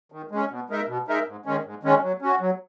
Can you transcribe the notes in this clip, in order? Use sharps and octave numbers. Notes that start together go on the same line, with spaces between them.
D#3
G#3 C#4
B2
G#3 D#4 A#4 E5
B2
G#3 D#4 A#4 E5
G#2
D#3 G#3 C#4
G#2
D#3 G#3 C#4
F#3
C#4 F#4
F#3